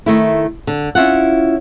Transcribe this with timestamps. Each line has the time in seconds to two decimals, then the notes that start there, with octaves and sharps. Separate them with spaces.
0.06 D#3 A3 E4
0.67 D3
0.95 C#4 E4 F4 F#5